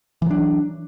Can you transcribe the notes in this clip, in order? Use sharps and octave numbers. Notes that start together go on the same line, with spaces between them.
E3 F#3 D4